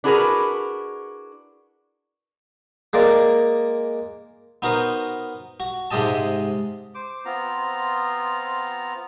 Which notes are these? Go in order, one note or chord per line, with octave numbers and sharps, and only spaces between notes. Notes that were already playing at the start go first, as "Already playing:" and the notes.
D4 E4 F#4 G#4 A#4 B4
G#3 A#3 D5
B3 D#4 F#4 A#4 C5
F#4
G#2 C3 G#3 G4 D#5 A5
C5 D6
B3 C4 F4 A#5